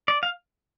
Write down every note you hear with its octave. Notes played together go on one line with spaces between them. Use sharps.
D5
F5